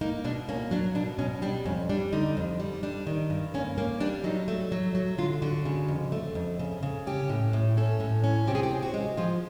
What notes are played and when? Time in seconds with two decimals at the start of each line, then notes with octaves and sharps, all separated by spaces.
0.01 A#3 D#4
0.24 B2 D4
0.49 A#3 C#4
0.71 F#3 D4
0.95 B2 D4
1.18 B2 C#4
1.42 G3 D4
1.66 F2 C#4
1.89 G3 D4
2.13 D3 D#4
2.37 F2
2.60 G3
2.83 G3 D4
3.07 D#3
3.30 G2
3.54 A#3 C#4
3.78 A#3 C#4
4.00 G3 D4
4.24 F#3 D#4
4.48 A3
4.72 F#3
4.95 F#3
5.18 D3 F4
5.42 D3 F#4
5.65 C#3
5.88 F2
6.12 A3
6.35 F2
6.59 C#3
6.83 C#3
7.07 C#4 G4
7.29 A2
7.53 A2
7.77 C#4 A4
8.00 A2
8.24 C#4
8.47 C3 G4
8.55 G#4
8.63 G4
8.71 C4
8.82 F#4
8.94 G#3
9.17 F3 F4